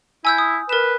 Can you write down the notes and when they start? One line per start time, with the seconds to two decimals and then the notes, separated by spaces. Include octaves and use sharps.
0.25 E4 G#5 E6 G6
0.38 D#6
0.69 A#4 B4 E7